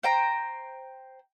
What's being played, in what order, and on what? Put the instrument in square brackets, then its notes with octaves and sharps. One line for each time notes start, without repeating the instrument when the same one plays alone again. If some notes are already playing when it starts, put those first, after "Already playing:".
[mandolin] C5 G5 A#5